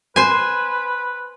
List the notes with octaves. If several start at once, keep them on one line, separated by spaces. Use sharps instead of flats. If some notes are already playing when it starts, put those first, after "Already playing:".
B4 C5 G#5